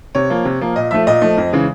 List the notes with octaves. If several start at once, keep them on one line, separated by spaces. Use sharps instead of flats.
C3 C#5
F3 A#3
C3
F3 A#3
A#2 D#5
F3 A3 E5
A#2 D#5
F3 A3
F2
C#3 E3 G#3